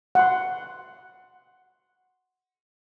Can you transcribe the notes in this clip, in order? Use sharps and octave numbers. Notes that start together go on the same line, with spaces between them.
F#5 C6